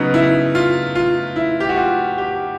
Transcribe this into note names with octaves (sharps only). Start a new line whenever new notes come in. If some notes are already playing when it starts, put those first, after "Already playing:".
Already playing: C#3 F#3 B3 D#4
E4
F4
F4
E4
G4
F#4
F4
G4